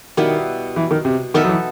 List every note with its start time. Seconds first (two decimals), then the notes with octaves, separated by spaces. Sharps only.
0.17 B2 D#3 G3 B3 E4
0.76 E3
0.91 D#3
1.05 C3
1.34 D#3 B3 D#4 A4 E5
1.45 F#3
1.49 E3